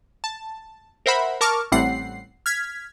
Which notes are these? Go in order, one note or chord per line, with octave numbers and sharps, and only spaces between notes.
A5
A#4 C5 E5 F#5 B5
A#4 A5 C#6 D6 F6
A1 A2 G3 C4 F#5 C7
F6 G#6 B6